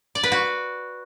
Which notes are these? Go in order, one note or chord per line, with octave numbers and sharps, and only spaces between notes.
D5
B4
F#4